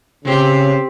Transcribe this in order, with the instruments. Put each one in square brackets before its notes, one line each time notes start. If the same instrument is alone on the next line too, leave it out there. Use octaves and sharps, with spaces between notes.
[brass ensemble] C#3 [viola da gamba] C4 G4